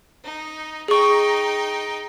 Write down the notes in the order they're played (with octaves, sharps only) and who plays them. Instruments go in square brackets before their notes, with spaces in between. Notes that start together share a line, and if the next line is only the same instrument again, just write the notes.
[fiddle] D#4
[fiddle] D#4 G5 [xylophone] G#4 C#6